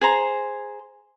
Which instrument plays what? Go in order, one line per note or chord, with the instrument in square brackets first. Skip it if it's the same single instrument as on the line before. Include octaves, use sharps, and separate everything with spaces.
[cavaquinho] G#4 C5 A#5